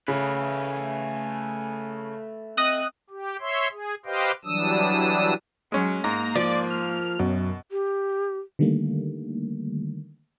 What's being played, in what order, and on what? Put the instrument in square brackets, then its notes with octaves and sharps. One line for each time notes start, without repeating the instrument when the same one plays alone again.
[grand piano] C#3 [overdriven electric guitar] A3 B4 [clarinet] G#5
[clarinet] C4 [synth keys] D#5 D#6 F#6
[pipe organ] G4
C#5 E5 C6
G#4
G4 B4 C5 D#5 F5 G5
E3 F#3 G3 D4 D#6 E6
[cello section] F#3 [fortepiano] G#3 C#4
[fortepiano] G#2 [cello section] A#3 [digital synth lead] A#5
[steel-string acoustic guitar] F3 [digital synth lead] D5
[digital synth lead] F6
[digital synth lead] F#2 [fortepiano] B2
[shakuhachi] G4
[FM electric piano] D3 D#3 G3 A3 A#3